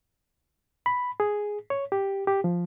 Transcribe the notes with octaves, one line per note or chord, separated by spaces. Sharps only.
B5
G#4
C#5
G4
G4
F3